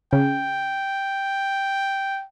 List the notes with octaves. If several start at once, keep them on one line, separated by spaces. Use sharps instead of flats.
C#3 G5